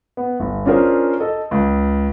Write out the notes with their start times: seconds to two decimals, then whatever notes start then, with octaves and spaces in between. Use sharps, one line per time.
0.17 B3
0.40 G1
0.66 C#4 D4 F4 G#4 A#4 C5
1.20 A4 D#5
1.51 C#2